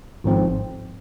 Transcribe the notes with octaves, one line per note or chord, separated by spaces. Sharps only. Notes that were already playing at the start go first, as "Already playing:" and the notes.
G#1 G#2 F3 C4